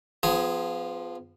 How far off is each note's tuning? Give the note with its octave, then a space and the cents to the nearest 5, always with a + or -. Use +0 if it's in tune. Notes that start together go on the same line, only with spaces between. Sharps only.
F3 +0 B3 +35 G#4 +0